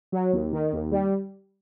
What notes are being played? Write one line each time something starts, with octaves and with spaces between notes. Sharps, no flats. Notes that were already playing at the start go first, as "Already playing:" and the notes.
F#3
D#2
D#3
D#2
G3